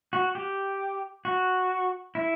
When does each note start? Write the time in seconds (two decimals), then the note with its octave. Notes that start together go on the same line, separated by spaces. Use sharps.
0.13 F#4
0.35 G4
1.25 F#4
2.15 E4